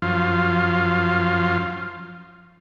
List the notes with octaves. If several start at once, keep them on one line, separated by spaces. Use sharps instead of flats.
F#2 F3 F4